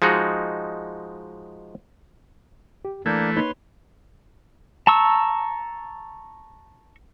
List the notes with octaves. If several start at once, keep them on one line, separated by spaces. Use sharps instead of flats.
F3 G#3 D#4 F#4
G4
E3 A3 A#3 D4 A#4 G6 G#6
A#3 D#4 B4 C#5 C6
A5 A#5 C#6 E6